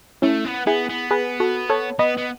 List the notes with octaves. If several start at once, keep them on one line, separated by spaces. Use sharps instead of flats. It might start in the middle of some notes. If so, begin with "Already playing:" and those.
A3 C#4 E4
B3
B3 E4 G#4
B3
G#4 B4
F#4 A4
A4 C#5
B3 B4 D#5
B3